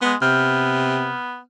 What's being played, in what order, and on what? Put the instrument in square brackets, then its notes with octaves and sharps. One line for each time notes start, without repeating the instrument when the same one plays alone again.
[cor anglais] G#3 [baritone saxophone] B3
[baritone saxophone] C3 [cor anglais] B3 [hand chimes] F6 G6